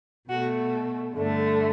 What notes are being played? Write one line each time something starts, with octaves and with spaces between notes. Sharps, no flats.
B2 A3 F#4
G2 D3 A3